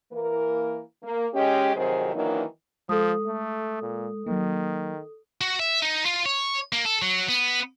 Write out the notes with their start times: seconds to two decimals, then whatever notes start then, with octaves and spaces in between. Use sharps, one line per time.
0.11 E3 A#3 A#4
1.03 A#3
1.34 G#3 C#4 G4
1.75 F2 C3 D#3 F#3 G#4 C5
2.14 D#3 E3 F#3 A#3 D4 D#4
2.89 F3 G#3 A4 D#6
3.27 A3
3.82 A#2
4.26 D#3 F#3 A#3
5.41 F#4
5.59 E5
5.82 D#4
6.06 F4
6.26 C#5
6.72 A#3
6.85 A4
7.02 F#3
7.29 B3